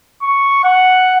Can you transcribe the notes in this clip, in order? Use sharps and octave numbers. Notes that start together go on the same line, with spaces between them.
C#6
F#5